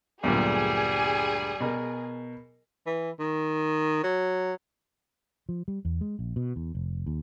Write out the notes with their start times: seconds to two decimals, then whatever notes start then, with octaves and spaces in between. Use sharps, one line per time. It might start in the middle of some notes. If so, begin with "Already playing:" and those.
0.23 D2 G2 A#2 F#3 G3 B3 D4 G#4
1.60 B2 A#4
2.86 E3
3.19 D#3
4.03 F#3
5.49 F3
5.68 G3
5.85 E2
6.01 G#3
6.19 A#1
6.36 B2
6.56 E2
6.75 F1
7.06 D#2